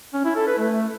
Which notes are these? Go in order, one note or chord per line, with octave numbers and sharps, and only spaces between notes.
C#4
E4
A4
B4
A3